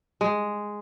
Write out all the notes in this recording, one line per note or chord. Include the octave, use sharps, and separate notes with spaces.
G#3